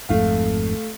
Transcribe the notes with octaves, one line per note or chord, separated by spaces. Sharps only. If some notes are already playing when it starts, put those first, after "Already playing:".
G#1 F2 G#2 A3 F5